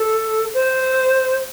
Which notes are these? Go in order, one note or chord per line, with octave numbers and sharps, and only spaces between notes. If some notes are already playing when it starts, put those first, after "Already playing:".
Already playing: A4
C5